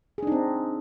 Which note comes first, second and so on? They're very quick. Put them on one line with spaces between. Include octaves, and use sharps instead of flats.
G#4 D4 D#4 C4